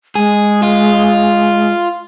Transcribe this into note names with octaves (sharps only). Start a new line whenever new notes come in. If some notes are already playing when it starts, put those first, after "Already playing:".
G#3 G#4
F4